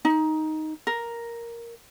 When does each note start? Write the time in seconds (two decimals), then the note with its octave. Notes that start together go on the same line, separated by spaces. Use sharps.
0.05 D#4
0.87 A#4